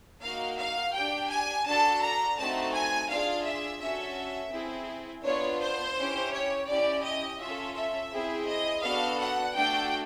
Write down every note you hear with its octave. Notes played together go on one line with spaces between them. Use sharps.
A#3 D#4 F#4 F5
F5
G4 G5
D4
G#5
D4 F#4 A4 A5
A#5
A3 C4 D#4 F#4 A5
G#5
D4 F4 G#4 F5
E5
C#4 F#4 A4 E5
C4 E4 G#4
B3 D4 F4 C#5
C5
C#4 E4 G4
C#5
C#4 E4 G4 D5
D#5
C#4 F4 A4 E5
E5
C4 E4 G#4
D#5
B3 D4 F#4 A4 F5
F#5
A3 D4 F#4 A4 G5